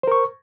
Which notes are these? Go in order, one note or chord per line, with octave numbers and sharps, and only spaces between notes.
A#4 C5 C#6